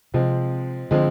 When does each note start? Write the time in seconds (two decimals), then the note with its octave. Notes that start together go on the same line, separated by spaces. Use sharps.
0.14 C3 F3 G#3 C4
0.91 D3 F3 G#3 C4